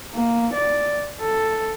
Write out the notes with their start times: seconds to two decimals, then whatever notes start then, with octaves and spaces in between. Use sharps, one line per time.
0.14 A#3
0.53 D5
1.21 A4